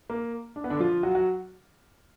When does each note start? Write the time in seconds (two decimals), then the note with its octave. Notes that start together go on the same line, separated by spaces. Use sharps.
0.10 A#3
0.56 D4
0.64 B3
0.70 D3 D4
0.80 F3 F4
1.03 F#3 F#4
1.15 F#3 F#4